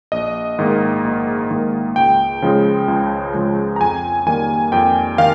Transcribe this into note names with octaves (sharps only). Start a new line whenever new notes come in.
A#1 D#5
G#2 D#3 A#3
A#1
G#2 D#3 A#3
C#2 G5
C#3 F3 G#3
C#2
C#3 F3 G#3
A#5
F2 G#5
D#3 G3 A#3 G#5
F2 G5
D#3 F5